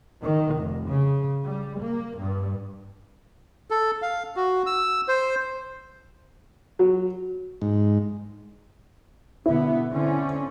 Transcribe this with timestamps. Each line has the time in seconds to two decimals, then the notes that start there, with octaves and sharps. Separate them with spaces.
0.21 D#3
0.53 F1
0.86 C#3
1.44 G3
1.79 A#3
2.18 G2
3.70 A4
4.02 F5
4.36 F#4
4.66 E6
5.08 C5
6.79 F#3
7.62 G#2
9.46 B2 D3 B3 E4
9.91 D3 C4 C#4